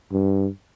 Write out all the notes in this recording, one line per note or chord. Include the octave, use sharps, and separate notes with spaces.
G2